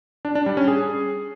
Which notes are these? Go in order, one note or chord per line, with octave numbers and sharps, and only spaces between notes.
D4
D4
G3
C#4
G#4